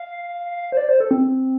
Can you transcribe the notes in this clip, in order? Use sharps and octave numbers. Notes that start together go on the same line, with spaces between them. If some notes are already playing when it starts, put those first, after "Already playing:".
Already playing: F5
C5
D5
C5
A4
C4